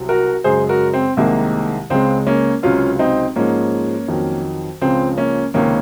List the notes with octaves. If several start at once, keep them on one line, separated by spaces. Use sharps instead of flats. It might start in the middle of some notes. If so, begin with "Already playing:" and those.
Already playing: C2 C3 F#3
F#4 A#4
F#2 C#3 G#3 G#4 C5
F#4 A#4
C4
C2 C3 D#3 G#3 A#3
C#2 C#3 G#3 C4
A#3 C#4
C#2 C3 F#3 C#4 F4
C4 D#4
G#2 F3 G#3 A#3 C#4
F2 D#3 F#3
C#2 C#3 F3 C4
A#3 C#4
C#2 C3 D#3 A#3 C#4